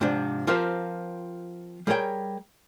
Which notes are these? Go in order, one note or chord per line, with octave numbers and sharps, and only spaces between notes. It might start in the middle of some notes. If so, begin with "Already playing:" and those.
G#2 C3 F3 D4
F3 C4 F4 G4 A#4 C5
G3 G#4 A#4 C#5 G5